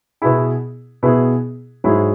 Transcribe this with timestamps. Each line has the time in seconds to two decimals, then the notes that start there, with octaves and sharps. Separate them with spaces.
0.22 B2 B3 E4 G#4
1.03 B2 B3 E4 G#4
1.84 G#2 F#3 E4 G#4